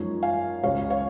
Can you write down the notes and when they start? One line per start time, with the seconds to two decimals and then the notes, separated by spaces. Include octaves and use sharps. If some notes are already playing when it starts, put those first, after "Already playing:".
Already playing: F#2 F3 G#3 D#4 C#5
0.23 F5 G#5
0.63 C#2 C#3 G#3 C#5 F5
0.90 C#5 F5